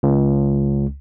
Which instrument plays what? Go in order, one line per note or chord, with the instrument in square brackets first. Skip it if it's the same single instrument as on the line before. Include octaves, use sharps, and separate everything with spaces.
[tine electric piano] C#2